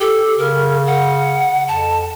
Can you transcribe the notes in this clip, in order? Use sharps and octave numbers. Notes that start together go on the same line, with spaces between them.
G4 A4
C#3 A#4
F#5
F2 A5